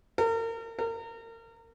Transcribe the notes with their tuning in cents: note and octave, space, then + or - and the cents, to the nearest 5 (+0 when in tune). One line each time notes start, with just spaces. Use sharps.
A#4 -35
A#4 -30